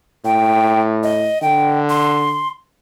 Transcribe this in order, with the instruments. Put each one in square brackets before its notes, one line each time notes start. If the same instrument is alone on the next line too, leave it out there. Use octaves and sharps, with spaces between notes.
[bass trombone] A2 [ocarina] G5
[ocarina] D#5
[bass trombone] D3 [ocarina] G5
[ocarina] C6